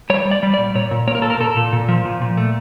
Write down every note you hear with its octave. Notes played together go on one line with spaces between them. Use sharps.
G3 C#5
G3
D5
G3
D5
A#2
A#2 C#5
A#2
A#3 C#5
A#4
A#2 A4
A#4
A#2 A4
A#2
A#2
F3
A#2
A#2
A3